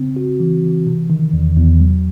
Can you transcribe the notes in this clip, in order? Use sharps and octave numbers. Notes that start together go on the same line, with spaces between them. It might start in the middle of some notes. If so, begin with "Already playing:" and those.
Already playing: C#3 C4
F#4
E3
E3
C3
D#3
E2
E2
F#3